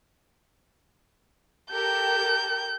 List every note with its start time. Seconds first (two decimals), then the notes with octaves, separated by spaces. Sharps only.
1.72 G4 A4 A#4 G6